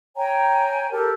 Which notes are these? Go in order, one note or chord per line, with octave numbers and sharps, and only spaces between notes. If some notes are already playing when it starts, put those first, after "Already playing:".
C#5 G5 G#5 A#5
G4 A4 A#4